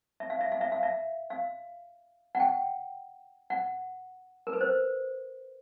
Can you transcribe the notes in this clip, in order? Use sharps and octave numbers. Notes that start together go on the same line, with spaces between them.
E5
F5
E5
F5
E5
F5
E5
F5
F#5
G5
F#5
A#4
B4
C5